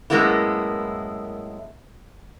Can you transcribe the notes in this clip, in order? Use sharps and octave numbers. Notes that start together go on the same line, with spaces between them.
F#2 A2 G#3 A#3 B3 E4